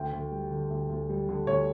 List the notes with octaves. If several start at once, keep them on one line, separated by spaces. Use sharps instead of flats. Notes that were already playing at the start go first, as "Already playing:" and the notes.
Already playing: D2 G5
D2
G3
D3
D2
D2
G3
D3
D2 C#5